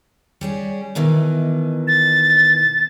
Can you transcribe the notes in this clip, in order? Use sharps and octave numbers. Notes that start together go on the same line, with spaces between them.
G3 C#4 G#4
B2 D#3 E3
A6